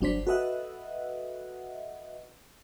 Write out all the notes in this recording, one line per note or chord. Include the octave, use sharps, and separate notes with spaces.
G1 F#3 D4 C5 B6
F#4 A4 B4 D#5 E5 F#5